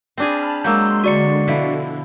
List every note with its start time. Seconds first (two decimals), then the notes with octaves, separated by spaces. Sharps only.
0.17 C4 D4 G#4 A5 B5 F6
0.64 F#3 G#3 A#3 C6 E6 G6
1.04 D3 F#4 D5 C#7
1.48 B2 F3 E4